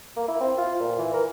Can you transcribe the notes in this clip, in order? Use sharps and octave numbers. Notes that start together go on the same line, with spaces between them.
A#3
E4
C4
F4
A#2
E3
A#4